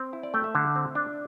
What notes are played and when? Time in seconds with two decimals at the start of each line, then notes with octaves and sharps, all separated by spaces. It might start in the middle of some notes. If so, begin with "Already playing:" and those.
Already playing: C4
0.13 E4
0.23 D5
0.34 A3 G5
0.44 E5
0.55 D3
0.75 C4
0.95 D4